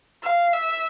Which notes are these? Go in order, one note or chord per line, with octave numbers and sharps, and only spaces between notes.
F5
E5